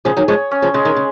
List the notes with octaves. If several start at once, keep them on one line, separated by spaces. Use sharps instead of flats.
C#3 F3 G#4
D#3 F#3
F3 G#3 C#5
C#4
C#3 F3
C#3 G#3
D#3
C#3